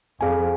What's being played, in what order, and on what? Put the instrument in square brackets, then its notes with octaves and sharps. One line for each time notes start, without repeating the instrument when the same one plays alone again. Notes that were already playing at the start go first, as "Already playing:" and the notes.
[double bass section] F2 [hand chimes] G#4 F5 G#5